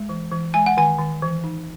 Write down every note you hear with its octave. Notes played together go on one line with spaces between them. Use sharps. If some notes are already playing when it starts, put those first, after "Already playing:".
Already playing: G#3
E3
E3
G#3 G#5
F#5
D#3 G#5
D#3
E3
D#4